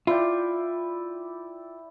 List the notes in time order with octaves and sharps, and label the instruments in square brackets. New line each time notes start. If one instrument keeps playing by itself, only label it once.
[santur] E4 D5 G5 [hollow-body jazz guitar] F4